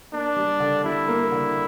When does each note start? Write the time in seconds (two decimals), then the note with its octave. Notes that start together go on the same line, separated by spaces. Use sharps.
0.13 A#3 D4
0.36 G3
0.60 D3
0.84 G3 E4
1.08 A#3
1.32 D3